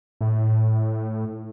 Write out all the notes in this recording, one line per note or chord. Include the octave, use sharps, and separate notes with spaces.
A2